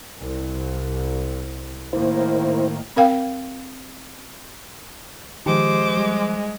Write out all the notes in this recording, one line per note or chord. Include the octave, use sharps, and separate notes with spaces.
C2
A2 D#3 A#3 E4 C5
C4 A#4 F5 G5
D#3 F3 G#3 G4 C5 D6
G3